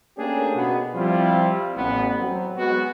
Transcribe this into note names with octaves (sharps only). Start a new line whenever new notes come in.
A3 A#3 C#4 D4 G4 G#4
B2 B3
F3 G3 C4 E4 F4
A1 B3
F#3 C4
G#3 B3 F#4